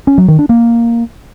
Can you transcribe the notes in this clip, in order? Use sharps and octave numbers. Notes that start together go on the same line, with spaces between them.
C#4
F#3
D#3
D4
A#3